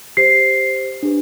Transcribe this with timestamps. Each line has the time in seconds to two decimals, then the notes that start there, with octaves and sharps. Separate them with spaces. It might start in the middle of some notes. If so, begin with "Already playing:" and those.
0.17 G4 C5 C7
1.03 D4 G4 B4